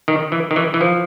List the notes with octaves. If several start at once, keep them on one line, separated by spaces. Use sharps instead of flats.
D#3
E3
D#3
E3
E3
F3